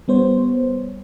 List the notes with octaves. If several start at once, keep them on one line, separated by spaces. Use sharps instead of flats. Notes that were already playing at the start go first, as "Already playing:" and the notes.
G3 B3 C5 C#5